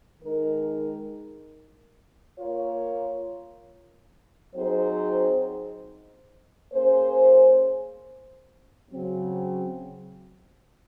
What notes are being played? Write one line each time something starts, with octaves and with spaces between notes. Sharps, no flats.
D#3 G#3 D#4 A#4
A#3 F4 A#4 C#5
F#3 C4 D#4 G#4 C5
A#3 C#4 G#4 C5
C#3 F#3 C4